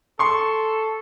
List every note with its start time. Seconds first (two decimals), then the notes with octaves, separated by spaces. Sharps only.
0.19 A4 C6 C#6